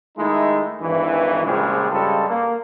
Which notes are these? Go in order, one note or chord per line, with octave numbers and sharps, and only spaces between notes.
D#3 G#3 A3 D#4 E4
G#1 G2 E3
A#1 C#3 F3 G3 G#3
G2 C#3 G3 G#3 A4
A#3